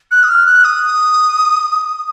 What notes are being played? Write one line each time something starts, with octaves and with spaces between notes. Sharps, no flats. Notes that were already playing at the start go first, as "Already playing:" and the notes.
F#6
D#6
F6
F#6
D#6